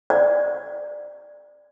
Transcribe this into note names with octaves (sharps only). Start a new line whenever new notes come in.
D5